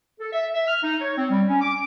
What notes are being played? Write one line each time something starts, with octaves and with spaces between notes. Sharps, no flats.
A4
E5
E5
F6
D#4
C#5
C4
G3
C#4
D6